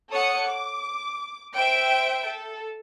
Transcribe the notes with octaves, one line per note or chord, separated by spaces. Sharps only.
A4 C#5 F#5 D#6 C#7
D6
C5 E5 G5 D7
A4